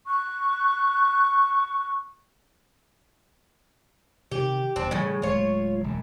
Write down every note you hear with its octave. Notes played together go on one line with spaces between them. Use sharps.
C#6 F#6
C3 D#3 G4
D#1 C4 D4
A2 C#3 E3 F#3 G3
D1 G#3 F4 C#5
E1 F#2